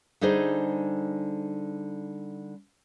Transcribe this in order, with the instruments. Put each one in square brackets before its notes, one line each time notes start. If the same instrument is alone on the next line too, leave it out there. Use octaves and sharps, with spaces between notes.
[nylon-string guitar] D3 G3 D#4 G#4 C5